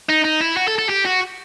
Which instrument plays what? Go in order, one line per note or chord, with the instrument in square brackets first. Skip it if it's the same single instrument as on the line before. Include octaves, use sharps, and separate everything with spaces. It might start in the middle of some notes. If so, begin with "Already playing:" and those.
[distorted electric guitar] D#4
D#4
E4
F#4
A4
A4
G4
F#4